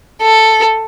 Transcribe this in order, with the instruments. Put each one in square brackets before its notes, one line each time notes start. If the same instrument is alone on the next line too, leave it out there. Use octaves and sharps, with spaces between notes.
[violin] A4